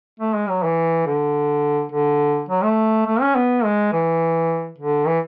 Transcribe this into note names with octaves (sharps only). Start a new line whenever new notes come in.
A3
G#3
F#3
E3
D3
D3
F#3
A3
A3
C#4
B3
G#3
E3
D3
E3